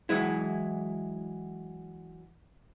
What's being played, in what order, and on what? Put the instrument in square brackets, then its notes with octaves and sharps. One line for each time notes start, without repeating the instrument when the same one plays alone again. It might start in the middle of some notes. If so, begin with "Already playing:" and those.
[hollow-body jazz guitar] E3 F#3 G#3 E4